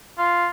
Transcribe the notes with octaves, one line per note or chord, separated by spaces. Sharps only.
F4